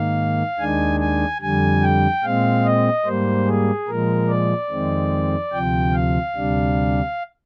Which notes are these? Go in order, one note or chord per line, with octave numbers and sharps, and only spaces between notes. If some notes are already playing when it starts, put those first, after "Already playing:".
Already playing: G#2 D#3 A#3 F5
D#2 D#3 G#3 D4 G#5
G#5
F2 D3 G3 G#5
G5
A#2 G#3 C4 F5
D#5
G#2 G3 A#3 C5
G#4
A#2 F3 G#3 A#4
D5
F2 D#3 G#3 C4
D2 C3 F3 G5
F5
D2 C3 G3 D4